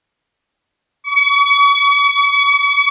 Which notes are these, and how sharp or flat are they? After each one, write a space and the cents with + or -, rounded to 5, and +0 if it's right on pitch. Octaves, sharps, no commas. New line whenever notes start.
C#6 +40